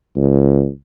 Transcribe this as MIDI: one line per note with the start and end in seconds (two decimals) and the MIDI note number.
0.16 0.68 37